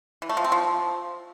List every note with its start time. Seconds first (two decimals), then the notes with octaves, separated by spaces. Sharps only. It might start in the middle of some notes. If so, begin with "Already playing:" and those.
0.22 E3
0.29 A3
0.37 F3
0.44 C4
0.52 F3